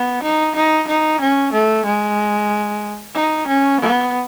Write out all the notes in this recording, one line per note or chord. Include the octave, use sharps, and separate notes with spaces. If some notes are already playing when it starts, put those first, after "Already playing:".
Already playing: B3
D#4
D#4
D#4
C#4
A3
G#3
D#4
C#4
B3